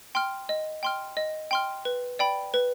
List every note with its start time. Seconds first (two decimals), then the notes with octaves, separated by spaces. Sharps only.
0.15 G5 C6 F6
0.49 D#5
0.83 G5 C6 F6
1.17 D#5
1.51 G5 C6 F6
1.85 B4
2.19 D5 G5 B5
2.54 B4